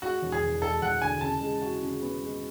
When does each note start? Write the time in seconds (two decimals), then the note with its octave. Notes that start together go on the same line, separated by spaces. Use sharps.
0.02 G#3 F#4
0.22 E1
0.32 G#4
0.42 E2
0.62 G#3 A4
0.82 E1 F#5
1.01 D3 G#5
1.21 C#3 A5
1.41 G#3
1.62 F#4
1.82 C#3
2.02 B3
2.21 G#3